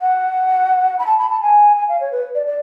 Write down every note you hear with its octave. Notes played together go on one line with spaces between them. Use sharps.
F#5
B5
A5
B5
A5
G#5
G#5
F5
C#5
B4
D5
D5